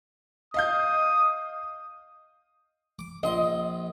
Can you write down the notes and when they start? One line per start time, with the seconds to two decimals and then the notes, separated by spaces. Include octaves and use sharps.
0.54 D#5 F5 D#6 G6
2.99 D6
3.23 A#1 D#5 C6